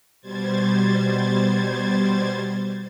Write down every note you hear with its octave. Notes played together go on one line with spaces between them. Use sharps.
B2 G3 C5 G#6 A6